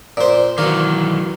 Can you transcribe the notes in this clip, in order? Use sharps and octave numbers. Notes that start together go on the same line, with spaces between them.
A#2 C5 D5
D#3 E3 F#3 A#3 F#4